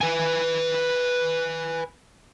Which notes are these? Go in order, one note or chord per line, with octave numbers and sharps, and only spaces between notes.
B4 G#5